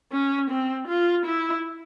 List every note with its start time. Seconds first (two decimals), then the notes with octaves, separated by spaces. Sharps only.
0.12 C#4
0.50 C4
0.88 F4
1.25 E4